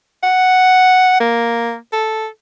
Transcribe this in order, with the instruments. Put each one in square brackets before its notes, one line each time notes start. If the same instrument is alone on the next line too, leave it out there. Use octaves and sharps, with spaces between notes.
[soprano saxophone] F#5
A#3
A4